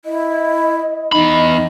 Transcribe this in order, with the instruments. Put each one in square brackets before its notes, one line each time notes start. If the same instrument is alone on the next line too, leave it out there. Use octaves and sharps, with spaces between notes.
[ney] E4 [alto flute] D#5
[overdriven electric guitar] E2 B5 [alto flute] D#4 [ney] D#5